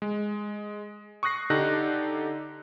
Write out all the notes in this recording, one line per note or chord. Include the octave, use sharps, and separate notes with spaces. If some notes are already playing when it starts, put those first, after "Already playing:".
G#3
C#6 D#6 F#6 A#6 C7
D3 D#4 G4 A4 F#6 A#6